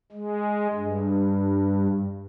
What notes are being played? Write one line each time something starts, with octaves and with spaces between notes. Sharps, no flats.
G#3
G2